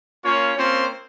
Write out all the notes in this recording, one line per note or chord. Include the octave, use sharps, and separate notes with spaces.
A#3 C#4 F4 C#5
A#3 C4 C#4 F4 C5